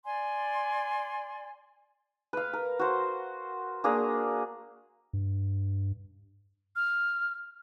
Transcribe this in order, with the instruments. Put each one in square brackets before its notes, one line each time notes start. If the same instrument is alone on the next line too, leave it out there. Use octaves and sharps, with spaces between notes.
[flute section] D5 G#5 C6
[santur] B4 F5
A#4
F#4 C5
A#3 D4 G#4 A#4
[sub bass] G2
[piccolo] F6